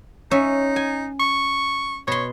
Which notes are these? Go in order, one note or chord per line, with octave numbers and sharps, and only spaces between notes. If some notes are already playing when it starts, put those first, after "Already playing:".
C#4 D#4 E5
G#5
C#6
B2 C#5 C6